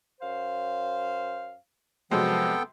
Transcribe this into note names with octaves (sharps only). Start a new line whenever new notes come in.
F#2 C5 F5
C3 F3 F#3 G#3 B3 A4 G5